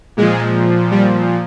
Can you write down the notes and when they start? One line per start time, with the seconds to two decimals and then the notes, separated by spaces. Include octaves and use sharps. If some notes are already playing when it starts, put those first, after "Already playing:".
0.17 A#2 F3 G#3
0.91 G3